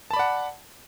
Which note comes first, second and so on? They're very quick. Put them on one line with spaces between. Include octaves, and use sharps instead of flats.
A5 B5 D5 F#5